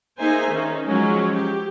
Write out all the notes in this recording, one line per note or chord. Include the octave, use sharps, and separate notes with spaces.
A#3 D#4 G#4 C5 E5 G#5
D#3 C#4 D#4
F3 F#3 G#3 C#4
G4